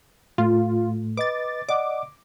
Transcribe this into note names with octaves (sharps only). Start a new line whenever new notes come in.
A2 A3 F4
B4 D#5 D6 A6
D5 D#5 F#5 D6